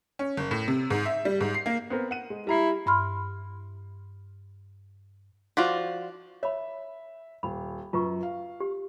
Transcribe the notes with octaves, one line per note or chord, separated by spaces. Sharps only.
C#4
F#1
A2
C3
G#2
E5
G3
G#2
C7
A#3
B3 C4 A#4
F#5 D#7
G#3
G3 E4 A#5 C7
G2 B5 C6 F6
F3 F4 F#4 D5
C#5 E5 B5
D#1 B5
F#2 F4 B4 C#6
F5
G4